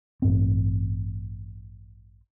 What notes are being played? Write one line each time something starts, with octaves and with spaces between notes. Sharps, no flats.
A1 G2 C4